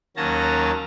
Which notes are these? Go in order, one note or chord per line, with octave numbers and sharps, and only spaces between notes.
D#2 F#3 A#3 C#4 A5 A#5